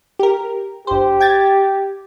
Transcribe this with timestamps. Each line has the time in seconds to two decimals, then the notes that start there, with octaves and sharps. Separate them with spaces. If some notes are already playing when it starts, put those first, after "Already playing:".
0.19 G4 A#4
0.87 G1 G4 C5
1.20 G5 G#6 A6